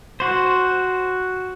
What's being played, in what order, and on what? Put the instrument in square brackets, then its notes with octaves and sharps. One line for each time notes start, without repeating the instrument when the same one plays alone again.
[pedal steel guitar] F#4 C5